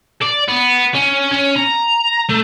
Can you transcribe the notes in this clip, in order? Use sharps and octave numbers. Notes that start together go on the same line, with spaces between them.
D5
B3
C#4
C#4
A#5
A3